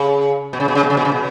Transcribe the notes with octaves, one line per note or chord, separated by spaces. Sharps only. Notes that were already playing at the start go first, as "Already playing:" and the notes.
Already playing: C#3
B2
C#3
B2
C#3
B2
C#3
B2
C#3
B2